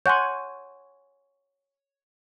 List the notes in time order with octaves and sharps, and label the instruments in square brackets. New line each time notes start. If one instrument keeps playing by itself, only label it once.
[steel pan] C#5 F#5 G#5 [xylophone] C6 G6